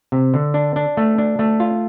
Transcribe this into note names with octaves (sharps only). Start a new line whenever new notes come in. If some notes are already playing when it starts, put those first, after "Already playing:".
C3
D3
D4
D4
A3
D4
A3
F4